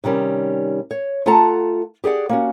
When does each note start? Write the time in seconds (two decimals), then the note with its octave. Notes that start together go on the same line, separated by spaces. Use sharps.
0.04 C3 D#3 G3 C#4
0.91 C#5
1.26 A3 F4 A4 F#5 A5 A#5
2.04 G4 G#4 D5 F#5
2.29 A#3 C#4 F#4